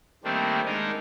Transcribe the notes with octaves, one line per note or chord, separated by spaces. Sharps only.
D#3 G3 A3 A#3 C4 D4
G#3 D4 D#4 A#4